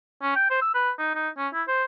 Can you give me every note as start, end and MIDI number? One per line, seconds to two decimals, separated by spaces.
0.22 0.31 61
0.36 0.47 79
0.50 0.60 72
0.62 0.71 88
0.74 0.91 71
0.99 1.11 63
1.15 1.29 63
1.37 1.48 61
1.53 1.63 64
1.68 1.84 72